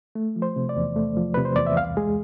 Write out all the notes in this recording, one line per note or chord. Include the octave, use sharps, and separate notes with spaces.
A3
F3
C5
C3
D5
E2
A3
F3
C3 B4
C5
E2 D5
E5
C2 F5
G#3 G#4